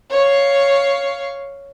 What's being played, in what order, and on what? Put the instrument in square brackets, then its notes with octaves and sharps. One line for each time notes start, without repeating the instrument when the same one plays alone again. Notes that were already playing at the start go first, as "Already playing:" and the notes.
[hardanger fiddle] C#5 F5